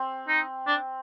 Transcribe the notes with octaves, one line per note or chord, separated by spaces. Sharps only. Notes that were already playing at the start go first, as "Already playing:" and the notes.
Already playing: C4
D#4
D4